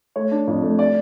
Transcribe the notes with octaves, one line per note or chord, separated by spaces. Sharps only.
A3 C#5
D4
F2
A3
D5